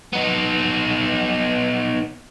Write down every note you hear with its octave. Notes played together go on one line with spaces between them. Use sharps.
B3 D#4